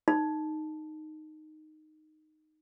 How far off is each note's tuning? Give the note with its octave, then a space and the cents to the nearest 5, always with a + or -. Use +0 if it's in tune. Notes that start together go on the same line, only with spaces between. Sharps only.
D#4 -5